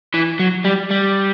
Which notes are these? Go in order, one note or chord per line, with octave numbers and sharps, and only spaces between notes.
E3
F#3
G3
G3